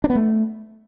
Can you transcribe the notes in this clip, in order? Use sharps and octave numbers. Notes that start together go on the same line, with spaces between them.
D4
B3
A3